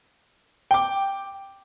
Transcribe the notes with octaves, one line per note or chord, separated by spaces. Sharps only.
G5 D6